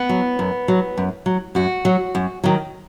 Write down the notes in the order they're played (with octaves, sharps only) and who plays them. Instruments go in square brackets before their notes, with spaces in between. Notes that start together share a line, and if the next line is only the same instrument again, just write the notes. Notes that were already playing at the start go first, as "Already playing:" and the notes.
Already playing: [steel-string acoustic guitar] B3
F#3
F#2
F#3
F#2
F#3
F#2 F#4
F#3
F#2
D#3 F#3